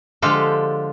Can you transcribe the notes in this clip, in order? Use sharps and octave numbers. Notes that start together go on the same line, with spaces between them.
D3 F3 G#3 F4 G4 A4